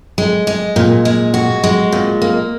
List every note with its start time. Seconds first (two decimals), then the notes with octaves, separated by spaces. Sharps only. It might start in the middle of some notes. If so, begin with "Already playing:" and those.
0.18 G#3
0.47 G#3
0.76 A#2
1.05 G#3
1.34 F#4
1.64 G#3
1.92 A#2
2.22 A#3